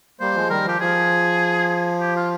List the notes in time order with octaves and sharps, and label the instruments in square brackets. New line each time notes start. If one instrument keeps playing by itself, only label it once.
[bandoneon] G3 A#3 [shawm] C5
[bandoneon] F3 G#3
[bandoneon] D#3 G3 [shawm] A#4
[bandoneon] F3 [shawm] G4
[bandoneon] F3 [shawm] G#4
[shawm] G4
F4